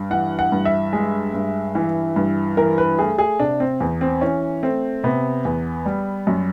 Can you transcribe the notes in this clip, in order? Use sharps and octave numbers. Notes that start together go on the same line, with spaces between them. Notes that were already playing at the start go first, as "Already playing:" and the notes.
Already playing: G2
E3 F#5
F#5
G2
E5
G#3
G2
E3
G2
E3 A#4
B4
A3 G#4
G#4
C3 D4
C4
E2
C4
E3 C#4
A3 C4
C3 B3
E2
G3
F#2